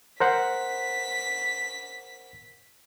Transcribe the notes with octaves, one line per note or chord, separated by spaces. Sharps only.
A#4 C5 F#5 B6